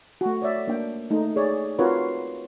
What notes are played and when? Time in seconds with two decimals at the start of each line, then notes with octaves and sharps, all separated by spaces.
0.21 A3 F#4
0.42 C#5 D5 E5
0.68 A#3 D4 G5
1.10 A3 D#4
1.36 G#4 C#5 D5
1.79 C4 F4 F#4 A#4 B4 C#5